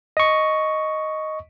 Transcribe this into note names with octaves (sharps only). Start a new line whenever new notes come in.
D#5 C#6